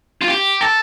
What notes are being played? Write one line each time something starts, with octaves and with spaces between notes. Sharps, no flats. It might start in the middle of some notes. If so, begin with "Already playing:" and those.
F4
G4
A4